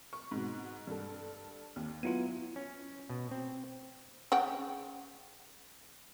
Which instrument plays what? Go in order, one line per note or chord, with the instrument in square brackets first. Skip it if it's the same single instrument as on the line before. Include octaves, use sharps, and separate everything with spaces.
[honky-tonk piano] C#6
G#2 B2
G2 A4
D#2
[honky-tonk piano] F#3 D#7 [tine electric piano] B3 E4 F4
[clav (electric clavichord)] C#4
B2
C4
[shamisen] C#3 F#5 G5